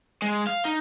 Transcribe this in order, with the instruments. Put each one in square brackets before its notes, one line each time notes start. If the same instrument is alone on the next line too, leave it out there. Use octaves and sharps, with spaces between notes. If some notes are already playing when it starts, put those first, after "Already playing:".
[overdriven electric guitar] G#3
F5
D#4